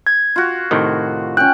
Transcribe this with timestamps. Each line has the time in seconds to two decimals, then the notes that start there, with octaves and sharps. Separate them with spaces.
0.07 G#6
0.36 F4 F#4
0.71 A2 C3 D#3
1.37 C#4 G5 F#6